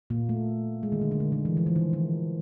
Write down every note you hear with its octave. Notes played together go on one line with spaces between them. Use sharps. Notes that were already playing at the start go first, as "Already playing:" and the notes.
A#2 A#3
A3
G#3
D#3
D3
D#3
D3
D#3
E3
F3
E3
D#3
D#3